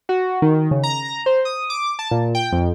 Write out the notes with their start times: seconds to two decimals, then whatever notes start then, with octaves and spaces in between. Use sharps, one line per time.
0.09 F#4
0.42 D#3
0.71 C#3
0.83 A#5
1.26 C5
1.45 D#6
1.70 D6
1.99 A5
2.11 A#2
2.35 G5
2.52 F2